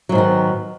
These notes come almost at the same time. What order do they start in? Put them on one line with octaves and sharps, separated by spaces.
F#3 G#2 D#3 B3